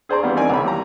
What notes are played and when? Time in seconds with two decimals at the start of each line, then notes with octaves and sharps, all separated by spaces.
0.09 G#4 C5 D5 A#5 C6
0.23 E3 G3 B3 D4 F4
0.37 C4 D#4 A#4 D5 G#5
0.50 C#2 E3 B5
0.65 G3 A#5